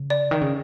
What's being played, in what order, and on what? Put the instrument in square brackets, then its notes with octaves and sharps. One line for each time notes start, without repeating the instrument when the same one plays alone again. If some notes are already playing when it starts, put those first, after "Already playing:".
Already playing: [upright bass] C#3
[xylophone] D5
[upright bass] D#3
C#3